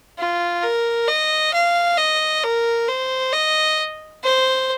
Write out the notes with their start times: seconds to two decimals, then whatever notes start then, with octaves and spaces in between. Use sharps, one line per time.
0.18 F4
0.62 A#4
1.07 D#5
1.53 F5
1.97 D#5
2.43 A#4
2.88 C5
3.32 D#5
4.23 C5